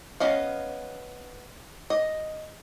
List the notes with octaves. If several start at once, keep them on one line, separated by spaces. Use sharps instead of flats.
B3 C#4 D#5 F5
D#5